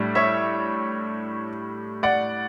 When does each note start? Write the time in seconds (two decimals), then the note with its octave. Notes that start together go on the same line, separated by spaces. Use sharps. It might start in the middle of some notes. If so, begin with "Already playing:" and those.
Already playing: A2 G3 D4
0.15 C#5 E5
2.03 D5 F#5